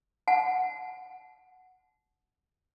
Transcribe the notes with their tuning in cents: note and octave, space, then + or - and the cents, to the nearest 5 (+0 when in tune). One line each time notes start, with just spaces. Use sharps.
F#5 +0 A5 -30